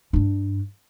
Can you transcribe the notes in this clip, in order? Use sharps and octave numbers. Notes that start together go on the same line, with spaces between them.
G2 D4